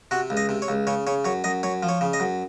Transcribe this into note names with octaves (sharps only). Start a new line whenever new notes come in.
C3 F#4
C#2
D#5
C3
C#5
C#2
C#3 C#5
C#3 C#5
F#2 C#5
F#2 D#5
F#2 C#5
F3
C#5
C#3
D#5
F#2